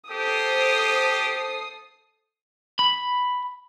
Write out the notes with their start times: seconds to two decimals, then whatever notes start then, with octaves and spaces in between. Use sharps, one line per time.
0.11 G4 A4 C5 D#6 C7
2.79 B5